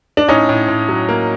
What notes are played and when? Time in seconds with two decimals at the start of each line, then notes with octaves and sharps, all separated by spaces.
0.17 D4
0.28 A2 C#4 D#4
0.49 A2
0.68 A2
0.89 F#3
1.09 A#3